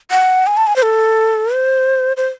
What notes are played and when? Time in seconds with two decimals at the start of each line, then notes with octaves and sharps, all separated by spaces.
0.11 F#5
0.47 G#5
0.57 A5
0.67 G#5
0.76 C5
0.82 A4
1.54 C5
2.17 C5